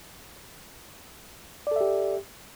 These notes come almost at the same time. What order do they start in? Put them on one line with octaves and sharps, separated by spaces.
D5 A4 E5 G4